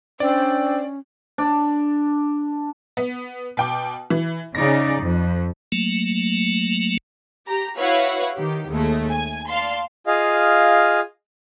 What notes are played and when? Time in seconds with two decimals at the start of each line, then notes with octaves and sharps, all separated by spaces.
0.20 C#4 D4 C5 D5 G5 E6
1.38 D4
2.97 B3
3.57 B2 G5 D6
4.10 E3
4.55 C#3 D#4 D5 A#6
5.01 F2
5.72 F#3 A3 A#3
7.47 G4 A#5
7.78 E4 F#4 B4 C#5 F5 F#5
8.35 D#3 G4
8.69 D#2 G#3 A3
9.09 G#5
9.48 D5 F5 A5 C6
10.07 F4 G#4 D#5 F5